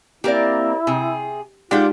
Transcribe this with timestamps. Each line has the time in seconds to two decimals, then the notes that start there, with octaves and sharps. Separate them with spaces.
0.24 A#3 C4 E4 G4 A#4 D5
0.87 C3 G#4
1.71 G#3 D4 D#4 F4 G4 G#4 F#5 G5